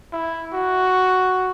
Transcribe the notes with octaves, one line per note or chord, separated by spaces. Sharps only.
E4
F#4